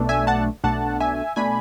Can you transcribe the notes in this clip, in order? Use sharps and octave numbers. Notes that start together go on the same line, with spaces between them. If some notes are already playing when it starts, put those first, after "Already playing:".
Already playing: B1 B2 A3 D4
E5 G#5
F#5 A5
B1 B2 A3 D4 F#5 A5
E5 G#5
B2 A3 D4 G#5 B5